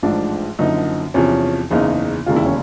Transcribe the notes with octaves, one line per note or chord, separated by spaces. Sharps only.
A1 G#2 F3 D4
F#1 F#2 D3 F3 D#4
E2 C3 F3 C#4
F#1 E2 C#3 D#4
E1 D#2 C#3 F4
E4
C#4